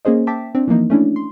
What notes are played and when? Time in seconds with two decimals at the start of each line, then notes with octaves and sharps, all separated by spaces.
0.05 A#3 C#4 G#4 C5 D#5
0.27 E5 G5 A5 D6 B6
0.55 C4 D4
0.68 E3 F3 A#3 D#4
0.90 A3 C#4 D4 E4
1.16 C6